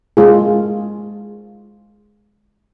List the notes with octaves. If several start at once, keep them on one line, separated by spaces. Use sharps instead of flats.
G#3 F4 G#4